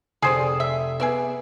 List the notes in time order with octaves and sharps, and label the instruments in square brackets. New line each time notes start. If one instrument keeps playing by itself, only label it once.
[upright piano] F1 D#6 C7 [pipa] G#4 C5 D5
[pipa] E5
[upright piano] B3 [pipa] G#4 D5 E5